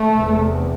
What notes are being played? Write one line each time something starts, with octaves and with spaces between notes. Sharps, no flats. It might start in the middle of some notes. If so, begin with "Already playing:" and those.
Already playing: A3
F1 E2 C3